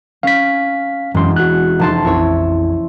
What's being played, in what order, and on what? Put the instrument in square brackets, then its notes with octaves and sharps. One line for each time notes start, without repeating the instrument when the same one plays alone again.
[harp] C#4 [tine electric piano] F5 B6
[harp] E1 [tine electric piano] F#2 C6
[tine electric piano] F#4 F#6
[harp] F1 A5 C6
[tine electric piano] A#1 F2 [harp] E4 C#5